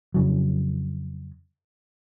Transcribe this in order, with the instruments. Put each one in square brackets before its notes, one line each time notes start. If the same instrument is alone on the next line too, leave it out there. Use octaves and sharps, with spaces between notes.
[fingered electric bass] F2 C#3 F#3